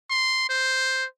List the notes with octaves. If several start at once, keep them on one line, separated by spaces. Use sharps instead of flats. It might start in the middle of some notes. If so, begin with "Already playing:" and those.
C6
C5